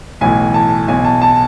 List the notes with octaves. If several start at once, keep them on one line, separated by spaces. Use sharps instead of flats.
B1 A2 E3 G#5
A5
B1 B2 G#5
A5
A5